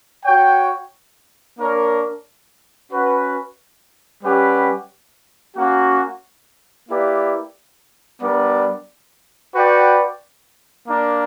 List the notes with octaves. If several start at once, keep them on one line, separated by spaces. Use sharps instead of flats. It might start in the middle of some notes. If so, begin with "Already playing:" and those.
F#4 C#5 G5
A#3 D4 A#4 C#5
C#4 F#4 B4 F#5
G3 C#4 G4 B4 F#5
A#3 C#4 F#4
A#3 E4 G4 B4 D5
G3 B3 D4 A#4 D5
F#4 B4 D5 G5
A#3 D4 A#4